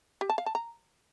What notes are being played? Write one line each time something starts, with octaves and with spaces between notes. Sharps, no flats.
G4
A5
F5
A5
A#5